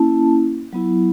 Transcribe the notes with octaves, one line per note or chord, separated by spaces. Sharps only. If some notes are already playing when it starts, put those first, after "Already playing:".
Already playing: A#3 C#4 E4 A5
F#3 B3 E4